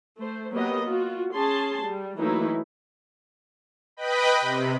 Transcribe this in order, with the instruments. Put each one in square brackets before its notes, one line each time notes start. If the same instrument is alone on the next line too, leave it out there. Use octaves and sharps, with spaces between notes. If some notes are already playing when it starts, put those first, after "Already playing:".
[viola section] A3 C5
F#3 A#3 B3 G4 B4 D#5
F4 F#4
C#4 G#4 A5 C6
G3
E3 F#3 A3 A#3 D#4 E4
[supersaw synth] B4 D#5 G5 B5
C3